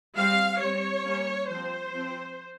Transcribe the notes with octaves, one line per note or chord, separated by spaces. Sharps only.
G3 C4 F5
G3 C4 C#5
G3 A#3 C#4
F3 C4 C5
F3 C4